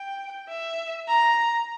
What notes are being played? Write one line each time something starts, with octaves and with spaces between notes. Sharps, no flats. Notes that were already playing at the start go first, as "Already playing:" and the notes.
Already playing: G5
E5
A#5